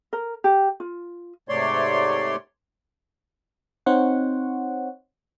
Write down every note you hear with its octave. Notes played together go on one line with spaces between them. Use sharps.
A#4
G4
F4
G#2 C3 A3 C#5 D5 C6
C4 D#4 C5 C#5 F#5